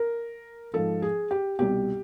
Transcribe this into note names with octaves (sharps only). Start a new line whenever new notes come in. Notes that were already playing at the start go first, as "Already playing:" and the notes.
Already playing: A#4
G#2 F3 A4
G#4
G4
C2 B2 G4